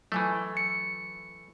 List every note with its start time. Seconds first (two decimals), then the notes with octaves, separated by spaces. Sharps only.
0.12 E3 F#3 A3 G#5
0.57 C#7